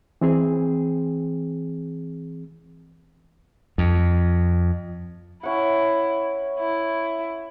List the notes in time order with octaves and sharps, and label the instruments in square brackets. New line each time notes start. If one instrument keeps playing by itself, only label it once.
[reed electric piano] E3 C4 G#4
[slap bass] F2
[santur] C#4 F#5 [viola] E4
[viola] E4